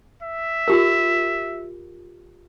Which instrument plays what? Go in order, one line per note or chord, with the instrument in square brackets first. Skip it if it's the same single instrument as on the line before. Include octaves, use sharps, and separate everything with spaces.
[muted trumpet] E5
[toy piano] F4 G4 A#4